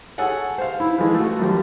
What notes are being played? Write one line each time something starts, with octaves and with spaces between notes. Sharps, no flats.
G#4 A4 C#5 F#5 G#5
C5 F5
E4
E3 F3 G#3
A3 F#4
F#2 F3 G3